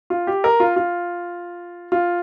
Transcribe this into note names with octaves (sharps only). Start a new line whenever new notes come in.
F4
G4
A#4
F4
F4
F4